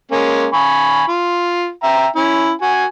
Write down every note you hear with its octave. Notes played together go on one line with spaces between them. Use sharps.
G#3 A#3 C#4
G#5 B5 C#6
F4
E5 G5 A#5
C#4 E4
F#4 G#5